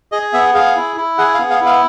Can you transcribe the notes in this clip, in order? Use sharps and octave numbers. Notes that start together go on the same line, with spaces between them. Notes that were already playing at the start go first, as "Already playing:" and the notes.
G#4 D#5
B3 E5
G#4 F5
E4
E4
G#4 F#5
F5
B3
F5
E4
F5